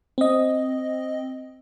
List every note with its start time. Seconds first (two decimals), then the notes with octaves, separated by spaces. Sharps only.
0.18 C4 D#5